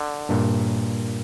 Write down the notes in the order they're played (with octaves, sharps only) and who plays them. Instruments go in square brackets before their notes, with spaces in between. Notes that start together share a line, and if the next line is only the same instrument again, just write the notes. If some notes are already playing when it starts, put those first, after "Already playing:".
Already playing: [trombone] D3
[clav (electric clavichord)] G2 A#2